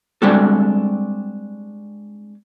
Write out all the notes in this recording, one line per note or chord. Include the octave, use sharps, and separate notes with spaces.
G3 G#3 C4 D4 F#4 A4